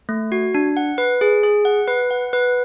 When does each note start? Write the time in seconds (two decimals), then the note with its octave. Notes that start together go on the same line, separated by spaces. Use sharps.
0.09 A3
0.32 F#4
0.55 D4
0.77 F#5
0.98 B4
1.21 G#4
1.43 G#4
1.65 F#5
1.88 B4
2.11 F#5
2.33 B4